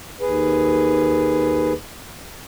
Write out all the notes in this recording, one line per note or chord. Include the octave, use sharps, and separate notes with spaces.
D#2 G#4 B4